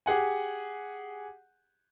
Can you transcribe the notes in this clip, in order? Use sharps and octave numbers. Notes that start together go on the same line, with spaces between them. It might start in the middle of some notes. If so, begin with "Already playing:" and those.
G4 G#4 F#5 G#5